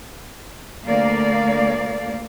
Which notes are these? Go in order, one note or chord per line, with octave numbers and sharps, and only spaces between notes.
D2 A#3 D5 F5